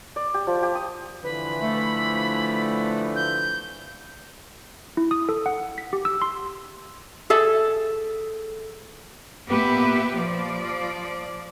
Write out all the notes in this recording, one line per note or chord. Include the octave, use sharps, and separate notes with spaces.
D5
G4
F3
G4
D#6
D3 E3 F3 B4 B5
A3
G6
E4
D#6
A4
F#5
B6
G4
E6
C6
G#4 A4 E5
A#2 B3 G4 B4 E5
F3 D5